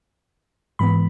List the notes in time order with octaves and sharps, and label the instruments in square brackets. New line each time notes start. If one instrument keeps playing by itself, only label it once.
[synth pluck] G#2 E3 B3 B5